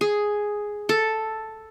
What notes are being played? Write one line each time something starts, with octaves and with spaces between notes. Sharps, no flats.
G#4
A4